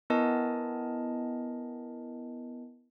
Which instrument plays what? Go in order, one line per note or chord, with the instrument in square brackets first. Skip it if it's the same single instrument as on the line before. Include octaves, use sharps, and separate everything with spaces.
[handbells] B3 E4 A#4 D#5 G#5 A5